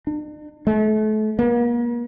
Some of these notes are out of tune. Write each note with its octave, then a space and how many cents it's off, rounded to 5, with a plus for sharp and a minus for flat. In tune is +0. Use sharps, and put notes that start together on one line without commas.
D4 +45
A3 -35
A#3 +40